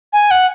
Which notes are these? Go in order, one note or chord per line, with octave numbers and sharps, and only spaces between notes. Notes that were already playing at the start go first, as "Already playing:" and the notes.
G#5
F#5